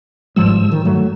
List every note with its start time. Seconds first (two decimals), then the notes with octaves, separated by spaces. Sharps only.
0.36 G1 G#2 F3 G3 E6
0.72 D#3
0.85 G2 F#3 A3